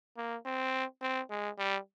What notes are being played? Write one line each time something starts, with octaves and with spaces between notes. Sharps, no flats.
A#3
C4
C4
G#3
G3